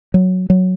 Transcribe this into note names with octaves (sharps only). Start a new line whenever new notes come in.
F#3
F#3